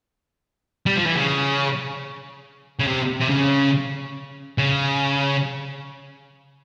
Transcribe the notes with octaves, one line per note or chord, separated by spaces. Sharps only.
G3
F3
E3
C#3
C#3
C3
C3
C#3
C#3